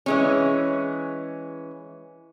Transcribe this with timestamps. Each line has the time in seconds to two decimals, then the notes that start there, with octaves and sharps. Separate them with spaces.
0.06 E3 G#3 C#4